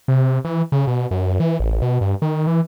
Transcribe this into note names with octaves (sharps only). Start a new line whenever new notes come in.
C3
E3
C#3
B2
F#2
E3
A1
B2
G2
D#3
E3